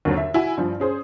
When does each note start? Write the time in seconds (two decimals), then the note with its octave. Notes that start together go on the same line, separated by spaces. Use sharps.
0.05 D#2 D3 F#3 C4
0.17 E5
0.34 E4 F#4 G#5
0.57 G2 F3
0.80 C#4 G#4 C5